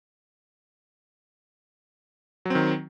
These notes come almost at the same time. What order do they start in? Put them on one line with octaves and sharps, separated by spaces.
F#3 C4 D#3